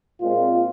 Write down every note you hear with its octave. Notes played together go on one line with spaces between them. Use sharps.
A#2 G#3 C4 F4